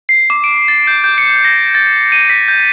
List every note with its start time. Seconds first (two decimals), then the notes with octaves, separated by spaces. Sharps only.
0.09 C7
0.30 D6
0.44 D7
0.68 A6
0.87 G6
1.04 G6
1.18 C#7
1.45 A#6
1.75 A6
2.12 D#7
2.30 B6
2.48 G6